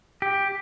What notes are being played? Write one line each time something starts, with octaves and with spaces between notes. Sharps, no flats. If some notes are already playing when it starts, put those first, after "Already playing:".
G4